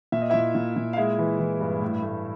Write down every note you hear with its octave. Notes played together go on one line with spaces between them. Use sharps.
A#2 E5
D#5
A#2 E4 E5
A#2
A#2
F5
G#3 E4 E5
E3
E3
G2
A2
A3